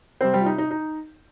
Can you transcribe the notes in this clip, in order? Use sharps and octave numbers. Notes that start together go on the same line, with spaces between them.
C3 G3 C4 C5
G3 G4
F4
D#4
D#4
D#4